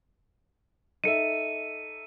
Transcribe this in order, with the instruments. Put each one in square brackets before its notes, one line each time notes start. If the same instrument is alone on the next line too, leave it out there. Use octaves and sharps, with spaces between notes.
[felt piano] D#4 A4 E5 [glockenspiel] C#7 D#7